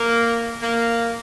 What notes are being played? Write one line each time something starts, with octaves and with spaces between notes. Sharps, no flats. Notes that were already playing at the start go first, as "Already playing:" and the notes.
Already playing: A#3
A#3